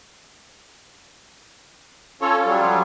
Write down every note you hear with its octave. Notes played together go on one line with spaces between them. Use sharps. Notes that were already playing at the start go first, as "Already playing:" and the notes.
C#4 F4 A4 C#5
F#3 G3
F3